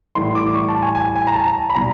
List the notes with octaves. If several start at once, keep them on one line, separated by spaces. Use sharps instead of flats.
A2 E3 G3 C6
D6
C#6
A5
G#5
G#5
G#5
A#5
A5
B5
B2 G3 A#5